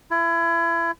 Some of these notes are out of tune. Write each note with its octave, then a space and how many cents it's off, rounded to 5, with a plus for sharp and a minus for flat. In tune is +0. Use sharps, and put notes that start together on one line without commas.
E4 +30